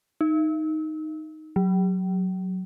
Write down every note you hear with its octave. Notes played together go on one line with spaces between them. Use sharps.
D#4
F#3